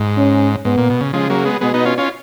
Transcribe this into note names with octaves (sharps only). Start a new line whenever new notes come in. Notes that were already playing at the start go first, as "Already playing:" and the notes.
Already playing: G#2
C#4
G#2 B3
A#2
B2
C#3
C#3 F3 G#3
F#3 A#3
G#3 B3
B2 G#3 B3
B3 D#4
C#4 F4
C#4 F4